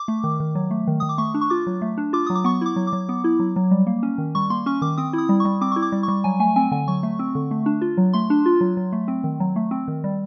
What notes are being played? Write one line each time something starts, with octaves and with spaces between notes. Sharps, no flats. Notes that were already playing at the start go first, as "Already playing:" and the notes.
Already playing: D6
A3
D#3
D#3
F#3
A3
D#3
D#3 D#6
D6
A3 C#6
D4
C#6
F4 D6
F#3
A3
D4
F4 D6
F#3 D#6
D6
B3 C#6
E4 D6
F#3
D6
F#3
B3
E4
F#3
F#3
G3
A#3
C#4
D#3
G3 C#6
A#3 C6
C#4 C#6
D#3 D6
C4 D#6
E4 D#6
G3
G3 C#6
C4 D6
E4 C#6
D6
G3
G3 C#6
F#3 G#5
A3 G#5
C4 G#5
D3 G#5
F#3 C#6
A3
C4
D3
A3
D4
F4
F#3
A3 C6
D4
F4
F#3
F#3
A3
C4
D#3
F#3
A3
C4
D#3
G3